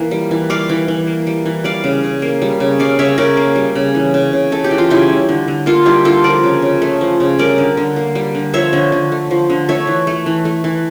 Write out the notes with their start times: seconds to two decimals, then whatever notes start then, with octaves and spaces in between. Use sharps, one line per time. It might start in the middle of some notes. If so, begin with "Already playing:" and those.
Already playing: E3 A#3
0.11 G3
0.31 E3
0.50 G3 D5 F5
0.69 E3
0.88 E3
1.07 A#3
1.27 G3
1.45 E3
1.64 G3 D5 F5
1.84 C#3
2.04 C#3
2.22 A#3
2.42 G3
2.60 C#3
2.79 G3 D5 F5
2.99 C#3 C#5 E5
3.18 C#3 A#4 D5
3.37 A#3
3.56 G3
3.75 C#3
3.95 E3
4.14 C#3
4.33 C#3
4.52 A3 A4
4.64 G4
4.71 E3
4.78 F4
4.90 C#3 E4 G4
5.09 G3
5.29 D3
5.48 D3
5.66 A#3 F4 A4
5.86 G3 E4 G4
6.04 D3 F4 A4
6.24 F3 A#4 D5
6.43 C#3
6.62 C#3
6.82 A3
7.01 F3
7.20 C#3
7.39 G3 A#4 D5
7.58 D3
7.77 D3
7.96 A#3
8.15 G3
8.35 D3
8.53 F3 C#5 E5
8.73 D3
8.92 D3
9.12 A3
9.31 F3
9.50 D3
9.69 A3 C#5 E5
9.87 E3
10.07 A3
10.26 E3
10.45 A3
10.64 E3